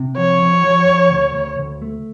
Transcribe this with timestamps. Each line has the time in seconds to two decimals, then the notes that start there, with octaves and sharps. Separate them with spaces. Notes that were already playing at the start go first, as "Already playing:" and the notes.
Already playing: C3
0.17 F3 C#5
0.40 F2
0.64 F3
0.88 F2
1.11 D2
1.35 D2
1.58 D2
1.82 A3